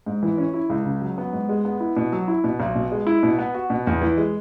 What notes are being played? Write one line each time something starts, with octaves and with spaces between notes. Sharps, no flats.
G#2
E3
C#4
E4
C#2
C#3
F#3
B3
G#2
G#3
B3
E4
B2
F#3
E4
B2
B1
B2
G#3
E4
B2
B3
F#4
B2
E2
E3
G#3